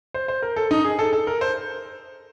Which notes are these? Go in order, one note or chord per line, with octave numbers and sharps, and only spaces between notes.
C5
C5
A#4
A4
D#4
G#4
A4
A4
A#4
C5